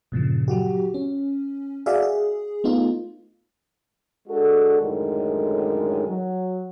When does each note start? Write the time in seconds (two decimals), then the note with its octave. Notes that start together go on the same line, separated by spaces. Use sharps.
0.12 G2 A#2 C#3 F3
0.48 F#3 F#4 G4
0.94 C#4
1.86 F#4 G#4 D5 E5 F5
2.02 G#4
2.64 A3 B3 D#4 F4
4.29 G#3 D4 F#4 A4
4.80 F#2 A2 D3 D#3 G#3
6.07 F#3